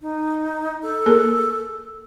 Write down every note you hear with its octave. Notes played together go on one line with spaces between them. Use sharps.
D#4
A4
A#3 G#4 A#4